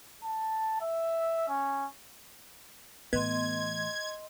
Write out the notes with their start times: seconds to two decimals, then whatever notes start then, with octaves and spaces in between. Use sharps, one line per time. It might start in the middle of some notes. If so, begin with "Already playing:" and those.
0.24 A5
0.81 E5
1.48 C#4
3.13 A2 E3 B3 D#5 C6 G#6